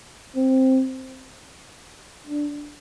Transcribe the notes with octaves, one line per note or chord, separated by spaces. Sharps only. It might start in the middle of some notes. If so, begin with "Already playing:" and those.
C4
D4